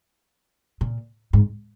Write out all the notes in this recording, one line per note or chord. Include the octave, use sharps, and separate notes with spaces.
A#2
G#2